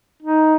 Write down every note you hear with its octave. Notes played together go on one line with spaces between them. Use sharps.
D#4